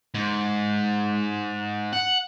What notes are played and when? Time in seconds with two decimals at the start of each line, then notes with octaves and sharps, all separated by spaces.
0.15 G#2
1.93 F#5